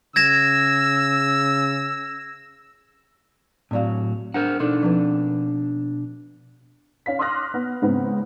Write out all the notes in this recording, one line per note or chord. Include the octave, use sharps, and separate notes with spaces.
C#3 E6 G#6 A#6 E7
A2 F#3 C4 D5 F5
D4 A#4 C5 F#5
B2 D4 D#4 A4
F3 C4 B4
C#4 F5 B6
C6 D6 D#6 F6 F#6 A#6
B3
G#2 C#3 B3 C4